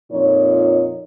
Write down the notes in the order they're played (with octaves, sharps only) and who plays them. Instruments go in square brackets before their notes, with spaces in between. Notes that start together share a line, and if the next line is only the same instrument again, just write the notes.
[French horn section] F2 A#2 D#4 C#5